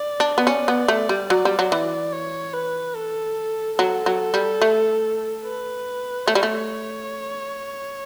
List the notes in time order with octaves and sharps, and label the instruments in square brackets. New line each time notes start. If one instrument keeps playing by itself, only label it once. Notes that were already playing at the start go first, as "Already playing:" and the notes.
Already playing: [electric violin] D5
[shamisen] D4
B3
[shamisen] C#4 [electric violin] D5
[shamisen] B3
A3
G3
[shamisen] F#3 [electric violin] D5
[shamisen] G3
F#3
E3
[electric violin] C#5
B4
A4
[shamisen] F#3 [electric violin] A4
[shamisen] F#3
G3
A3
[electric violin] B4
[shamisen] A3 [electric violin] C#5
[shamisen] G3
A3